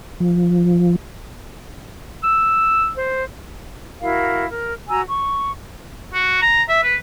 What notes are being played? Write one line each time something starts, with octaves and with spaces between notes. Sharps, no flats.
F3
E6
C5
E4 F#4 A#4 F5
A#4
F#4 G#5 A#5 E6
C#6
F#4
A#5
E5
B4